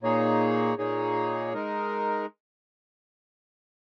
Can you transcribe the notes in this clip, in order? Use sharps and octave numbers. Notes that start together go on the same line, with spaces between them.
A#2 A#3 D#4 G#4 C#5
A#2 A#3 D#4 G#4 C#5
G#3 D#4 A#4